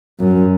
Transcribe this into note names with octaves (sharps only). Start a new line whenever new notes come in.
F#2